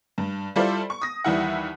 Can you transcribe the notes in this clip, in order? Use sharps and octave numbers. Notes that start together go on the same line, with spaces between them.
G2
G3 E4 F4 A4 C5 D5
C#6
D#6 A#6
D#2 E3 G3 E4 E5 F#5